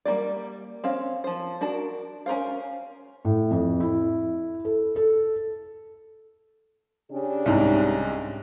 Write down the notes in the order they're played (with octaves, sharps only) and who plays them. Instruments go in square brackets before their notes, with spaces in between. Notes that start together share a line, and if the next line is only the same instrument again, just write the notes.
[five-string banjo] G3 A#3 F4 D5
C4 C#4 F5
F3 C5
D4 F#4 A#4 A5
C#4 A#4 C5 F5
[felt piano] A2
F2
E4
A4
A4
[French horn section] C#3 D4 G4
[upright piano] C2 G#2